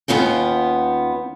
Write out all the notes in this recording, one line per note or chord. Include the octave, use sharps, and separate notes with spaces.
D#2 B3 C#4 F4 G5